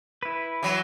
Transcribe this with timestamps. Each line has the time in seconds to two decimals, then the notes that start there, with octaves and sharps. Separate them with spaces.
0.23 E4 B4
0.63 E3 F#3